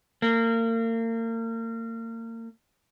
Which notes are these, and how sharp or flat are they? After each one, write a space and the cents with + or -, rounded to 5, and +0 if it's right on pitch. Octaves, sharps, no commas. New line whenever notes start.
A#3 -35